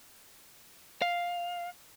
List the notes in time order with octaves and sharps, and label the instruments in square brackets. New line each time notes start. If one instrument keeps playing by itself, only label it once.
[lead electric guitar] F5